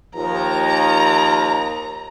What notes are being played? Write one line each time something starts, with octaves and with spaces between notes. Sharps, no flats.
D#2 F3 A#5